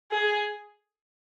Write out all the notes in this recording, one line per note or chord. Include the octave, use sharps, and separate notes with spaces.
G#4